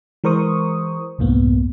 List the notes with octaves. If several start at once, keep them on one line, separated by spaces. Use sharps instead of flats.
E3 G#3 A#4 C5 C#6 D#6
C2 F2 G#2 A#3 B3